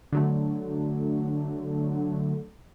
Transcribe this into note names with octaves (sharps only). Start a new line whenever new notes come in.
D3 F#3 A3